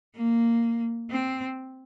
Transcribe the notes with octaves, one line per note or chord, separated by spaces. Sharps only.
A#3
C4